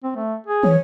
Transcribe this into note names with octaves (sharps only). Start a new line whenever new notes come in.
C4
A3
G#4
E3 C#5